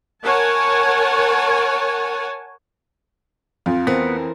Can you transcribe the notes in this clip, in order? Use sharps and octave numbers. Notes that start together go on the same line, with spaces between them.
A#4 C#5 F#5 G#5 A5
F2 F4
E3 B3 C4 A#4